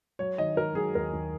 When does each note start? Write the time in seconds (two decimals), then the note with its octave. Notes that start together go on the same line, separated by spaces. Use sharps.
0.19 F#3 C#5
0.38 D#3 D#5
0.57 D#3 A#4
0.75 F#3 G#4
0.95 D#2 A#4
1.13 D#2